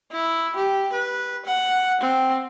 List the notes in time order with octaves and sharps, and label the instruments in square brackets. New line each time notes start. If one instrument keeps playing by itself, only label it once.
[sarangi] E4
G4
B4
F#5
C4